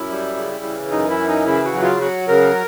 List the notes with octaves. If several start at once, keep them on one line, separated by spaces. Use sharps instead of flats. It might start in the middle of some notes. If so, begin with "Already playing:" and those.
Already playing: F#2 E4
G3
C#3
E3
F#2 D#4
E4
E3
D#4
C#3 E4
F#4
F#3
F4
F#3 F#4
C#3 A#4